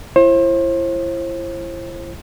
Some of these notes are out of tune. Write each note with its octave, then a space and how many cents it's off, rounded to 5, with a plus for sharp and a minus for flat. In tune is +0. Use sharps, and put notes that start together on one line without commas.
E4 +40 C5 +35